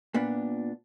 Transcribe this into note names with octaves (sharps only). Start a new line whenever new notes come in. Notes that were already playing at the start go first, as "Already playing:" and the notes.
A#2 B3 D4